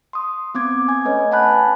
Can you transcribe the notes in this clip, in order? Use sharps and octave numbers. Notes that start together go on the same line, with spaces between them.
C6 D#6
B3 C4 D6 G#6
G#5 G#6
A3 C#4 B4 C#5 D#5
F#5 G#5 A5 B5 F#6 G6